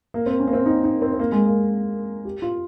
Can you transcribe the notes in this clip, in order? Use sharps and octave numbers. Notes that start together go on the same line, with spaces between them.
A#3
C4
C#4
A#3
C4
D#4
D#4
C4
C4
A#3
G#3
A#3
G4
F4